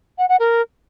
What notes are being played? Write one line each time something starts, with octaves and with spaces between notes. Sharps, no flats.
F#5
F#5
A#4